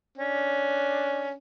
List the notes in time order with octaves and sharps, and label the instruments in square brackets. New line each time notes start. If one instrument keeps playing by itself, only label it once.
[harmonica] C#4 D4